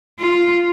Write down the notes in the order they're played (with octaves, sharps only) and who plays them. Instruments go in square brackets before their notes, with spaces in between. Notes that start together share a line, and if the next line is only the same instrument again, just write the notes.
[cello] F4